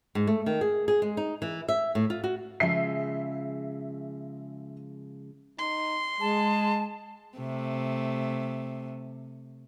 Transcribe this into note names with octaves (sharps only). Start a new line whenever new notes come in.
G#2
A3
D#3
G#4
G#4
G#3
D#4
E3
E5
A2
F4
F#4
C#3 F3 G#3 E5 C7
D#4 C6
G#3 G#4 A5
C3 A3